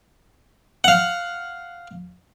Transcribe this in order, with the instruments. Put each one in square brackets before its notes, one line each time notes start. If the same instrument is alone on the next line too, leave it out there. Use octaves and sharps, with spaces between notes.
[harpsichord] F5 F#5